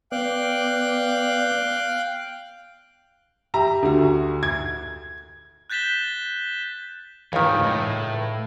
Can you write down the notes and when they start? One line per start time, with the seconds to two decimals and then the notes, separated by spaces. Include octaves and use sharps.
0.12 B3 D5 F5 G5 F#6
3.54 G4 E5 A#5
3.83 D2 F#4
4.43 G#6
5.70 F#6 G6 A6 B6 E7 G7
7.33 C#2 G#2 D#3 E3
7.63 A2